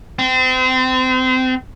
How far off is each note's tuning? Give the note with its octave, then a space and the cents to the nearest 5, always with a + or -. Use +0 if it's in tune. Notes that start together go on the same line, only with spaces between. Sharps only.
C4 -30